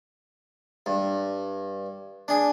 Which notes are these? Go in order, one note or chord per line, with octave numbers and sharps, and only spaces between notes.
G2
D4 G#4